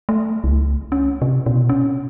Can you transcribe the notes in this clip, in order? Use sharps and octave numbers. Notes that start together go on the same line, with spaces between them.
A3
C#2
C#4
C3
B2
C#4